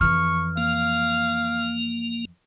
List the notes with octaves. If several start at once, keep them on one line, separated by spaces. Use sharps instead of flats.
F2 E3 C#6 F6
A#3 F5